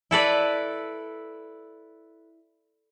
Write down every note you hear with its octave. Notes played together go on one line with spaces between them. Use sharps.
E4 A4 B4 D5